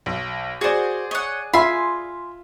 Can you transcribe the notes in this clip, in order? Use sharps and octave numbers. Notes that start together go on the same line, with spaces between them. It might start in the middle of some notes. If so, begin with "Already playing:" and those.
B1
F#4 G#4 C5 D5
C#5 D#5 F#5
F4 E5 G#5 B5 C6